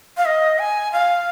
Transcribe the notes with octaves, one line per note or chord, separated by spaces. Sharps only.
F5
D#5
G#5
F5